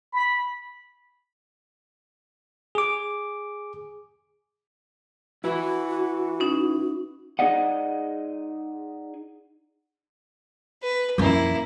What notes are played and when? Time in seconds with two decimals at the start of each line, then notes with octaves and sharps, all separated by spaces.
0.13 B5
2.75 G#4 D6
5.44 E4 F#4 B4
6.40 C#4 D#4
7.39 D#4 G#4 D5 D#5 F#5
10.83 B4
11.18 F#2 F3 A#3 E4